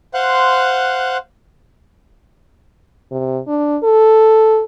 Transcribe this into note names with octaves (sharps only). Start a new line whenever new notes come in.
C5 F5 F#5 C6 F#6
C3
D4
A4